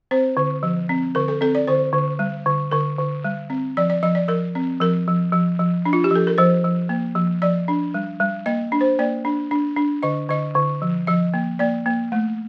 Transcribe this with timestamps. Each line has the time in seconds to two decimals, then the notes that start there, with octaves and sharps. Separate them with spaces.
0.11 C4 C5
0.37 D3
0.63 F3
0.89 C4
1.15 D3 A#4
1.28 A4
1.41 C4 A4
1.55 D5
1.67 D3 C5
1.93 D3
2.19 G3
2.46 D3
2.71 D3 A#4
2.99 D3
3.24 G3
3.50 C4
3.77 F3 D5
3.90 D5
4.03 F3 D#5
4.15 D5
4.28 F3 A#4
4.55 C4
4.80 F3 A#4
5.08 F3
5.33 F3
5.59 F3
5.85 D4
5.93 F4
6.04 G4
6.11 F3 A4
6.27 A#4
6.38 F3 C5
6.64 F3
6.89 A#3
7.16 F3
7.42 F3 D5
7.68 D4
7.94 G3
8.20 G3
8.46 A#3 D#5
8.72 D4
8.81 C5
8.99 A#3 D5
9.25 D4
9.51 D4
9.76 D4
10.03 D3 D#5
10.29 D3 D#5
10.55 D3
10.82 F3
11.07 F3 D#5
11.34 A#3
11.59 A#3 D5
11.86 A#3
12.12 A3